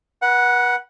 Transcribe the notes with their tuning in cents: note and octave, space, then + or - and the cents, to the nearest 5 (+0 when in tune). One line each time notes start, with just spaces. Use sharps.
B4 -35 F#5 +0